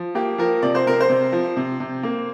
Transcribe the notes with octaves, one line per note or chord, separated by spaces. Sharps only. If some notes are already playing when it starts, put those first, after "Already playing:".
Already playing: F3
A#3 G4
F3 A#4
C3 D5
C5
C3 A#4
C5
C3
F3
C3
C3
A#3